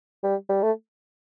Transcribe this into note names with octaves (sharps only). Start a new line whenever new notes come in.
G3
G3
A3